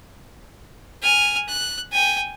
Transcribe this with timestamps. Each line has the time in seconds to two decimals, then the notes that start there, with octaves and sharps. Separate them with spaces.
1.03 G#5 F6
1.48 F#6
1.92 G5 G#5